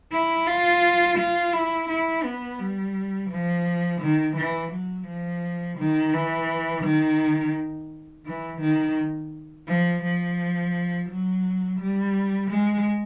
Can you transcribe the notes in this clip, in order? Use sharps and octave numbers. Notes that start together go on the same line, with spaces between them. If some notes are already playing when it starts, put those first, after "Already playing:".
E4
F4
F4
E4
E4
B3
G3
F3
D#3
E3
F#3
F3
D#3
E3
D#3
E3
D#3
F3
F3
F#3
G3
G#3